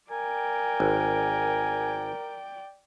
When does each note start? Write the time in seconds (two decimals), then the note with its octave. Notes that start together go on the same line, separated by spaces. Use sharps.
0.11 A#4 D5 G5 G#5
0.80 G#1